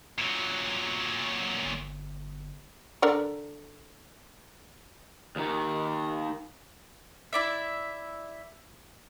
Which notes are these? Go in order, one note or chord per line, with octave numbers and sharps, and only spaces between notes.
A#2 F#3
G1
D3 A#4 D5
D#2 D#3
E4 D5 E5